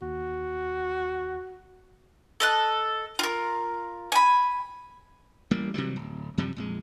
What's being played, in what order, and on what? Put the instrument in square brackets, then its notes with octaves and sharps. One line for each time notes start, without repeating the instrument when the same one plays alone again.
[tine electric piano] D#2 [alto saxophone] F#4
[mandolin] A4 D#5 F#6
F4 A#4
G#5 B5
[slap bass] A1 G3 A#3
C3 E3 F#3 G3
D1
F#2 C3 F3 G3
A#1 F2 G#3